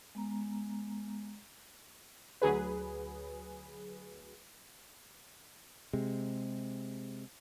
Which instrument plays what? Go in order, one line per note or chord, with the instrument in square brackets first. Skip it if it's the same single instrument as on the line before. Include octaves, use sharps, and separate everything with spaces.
[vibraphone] G#3 B3 A#5
[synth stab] D2 F#3 G#4 B4
[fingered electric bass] C3 G#3